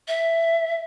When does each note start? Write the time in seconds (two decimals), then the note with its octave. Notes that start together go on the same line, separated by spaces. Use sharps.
0.08 E5